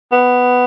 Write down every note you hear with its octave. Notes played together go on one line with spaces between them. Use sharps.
B3